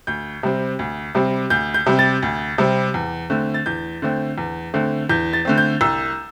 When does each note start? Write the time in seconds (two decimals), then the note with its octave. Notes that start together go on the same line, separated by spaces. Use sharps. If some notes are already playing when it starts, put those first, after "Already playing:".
0.07 D2 G6
0.43 C3 G3 C4
0.79 D2
1.15 C3 G3 C4
1.50 D2 G6
1.74 G6
1.86 C3 G3 C4
1.99 A6
2.22 D2
2.58 C3 G3 C4
2.94 E2
3.30 D3 A3 C4
3.54 A6
3.66 E2 G6
4.02 D3 A3 C4
4.38 E2
4.74 D3 A3 C4
5.09 E2 G6
5.33 A6
5.45 D3 A3 C4
5.58 G6
5.81 C2 E6